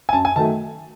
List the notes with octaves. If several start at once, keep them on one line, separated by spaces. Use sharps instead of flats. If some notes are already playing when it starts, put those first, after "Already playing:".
G#5
F#2 A5
G#5
D#3 F#3 A3 A5